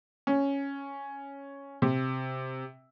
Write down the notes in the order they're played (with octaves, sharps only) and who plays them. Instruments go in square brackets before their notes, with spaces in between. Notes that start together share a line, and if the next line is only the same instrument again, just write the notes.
[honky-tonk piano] C#4
C3